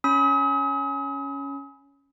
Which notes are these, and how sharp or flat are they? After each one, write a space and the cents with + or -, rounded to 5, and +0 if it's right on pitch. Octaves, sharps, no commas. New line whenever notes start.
C#4 +5 B5 +0 D#6 +40